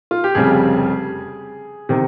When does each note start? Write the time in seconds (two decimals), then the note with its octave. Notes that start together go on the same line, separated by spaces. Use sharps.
0.11 F4
0.24 G4
0.35 F1 F2 C#3 G3 G#4
1.89 C3 D#3